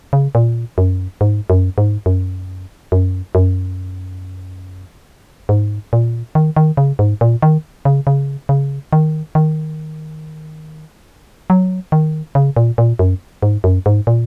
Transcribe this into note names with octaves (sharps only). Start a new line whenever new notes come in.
C#3
A#2
F#2
G#2
F#2
G#2
F#2
F#2
F#2
G#2
A#2
D#3
D#3
C#3
G#2
A#2
D#3
C#3
C#3
C#3
D#3
D#3
F#3
D#3
C#3
A#2
A#2
F#2
G#2
F#2
G#2
A#2